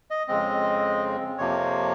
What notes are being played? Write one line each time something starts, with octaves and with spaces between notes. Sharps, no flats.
D#5
F2 C#3 G#3 C4 D#5
F2 C3 F3 A#3 C#5